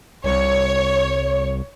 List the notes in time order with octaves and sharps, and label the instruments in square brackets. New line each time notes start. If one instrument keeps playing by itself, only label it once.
[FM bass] C2 [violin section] C#5